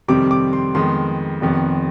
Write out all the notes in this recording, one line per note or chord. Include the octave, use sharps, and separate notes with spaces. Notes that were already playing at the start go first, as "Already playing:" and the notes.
F2 C3 D#3 G3 C4 D6
D6
C6
F2 D#3 G#3 B3 C6
F1 F2 C3 D#3 B3